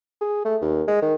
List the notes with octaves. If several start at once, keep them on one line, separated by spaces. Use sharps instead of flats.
G#4
A3
D#2
G#3
D#3